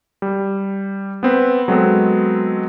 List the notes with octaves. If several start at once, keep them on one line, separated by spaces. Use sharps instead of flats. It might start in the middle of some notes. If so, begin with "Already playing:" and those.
G3
B3 C4 B4
F#3 G#3 B3 C4 A4